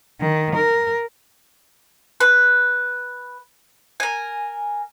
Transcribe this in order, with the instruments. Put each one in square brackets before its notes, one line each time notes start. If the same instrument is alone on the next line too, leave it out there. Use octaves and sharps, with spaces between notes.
[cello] D#3
A#4
[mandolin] B4
A#4 G#5